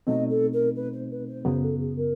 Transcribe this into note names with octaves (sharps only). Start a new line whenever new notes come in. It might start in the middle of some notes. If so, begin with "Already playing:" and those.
B2 F#3 A3 C4 D#4 D#5
A4
A#4
B4
C5
B4
C5
F#2 C#3 F#3 B3 C5
A4
G#4
A#4